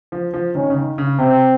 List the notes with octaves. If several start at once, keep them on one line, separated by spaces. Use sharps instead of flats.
F3
F3
D#3 C#4
C#3
D#3
C#3
C3 C4